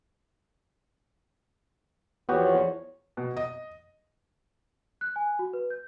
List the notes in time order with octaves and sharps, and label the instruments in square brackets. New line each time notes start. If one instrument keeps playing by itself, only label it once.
[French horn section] E2 F3 C#5 [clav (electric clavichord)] B3 F#4 G4
[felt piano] B2
D#5
[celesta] F#6
G#5
F#4
B4
G6